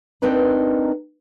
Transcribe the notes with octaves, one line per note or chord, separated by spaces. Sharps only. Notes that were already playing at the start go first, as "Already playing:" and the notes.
C4 D4 D#4 A#4 B4 A#5